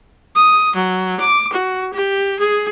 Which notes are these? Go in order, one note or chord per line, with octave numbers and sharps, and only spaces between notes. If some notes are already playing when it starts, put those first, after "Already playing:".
D#6
F#3
D6
F#4
G4
G#4